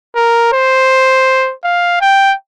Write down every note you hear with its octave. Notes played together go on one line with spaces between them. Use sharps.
A#4
C5
F5
G5